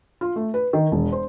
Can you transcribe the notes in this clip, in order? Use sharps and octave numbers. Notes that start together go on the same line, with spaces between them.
F4
A3
B4
D#3
E1
C5